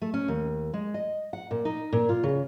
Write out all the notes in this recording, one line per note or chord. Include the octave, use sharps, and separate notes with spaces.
A3
C#4
D#2
G#3
D#5
F#5
A#2
D#4
A#2
F4
C#3